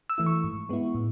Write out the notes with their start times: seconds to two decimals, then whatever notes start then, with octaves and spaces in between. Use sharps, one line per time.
0.10 E6
0.18 E3 A3 E4
0.26 C#6
0.44 G#2
0.69 G#3 B3 E4
0.95 A2